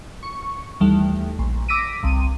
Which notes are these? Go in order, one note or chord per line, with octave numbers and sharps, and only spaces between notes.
C#6
D#2 E3 G3 A3
A#1
D6 E6 A#6 B6 D7 D#7
G1 C2 D#7